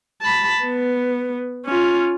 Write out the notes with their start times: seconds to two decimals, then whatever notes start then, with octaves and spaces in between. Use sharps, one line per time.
0.22 A5 B5
0.64 B3
1.66 C#4 F4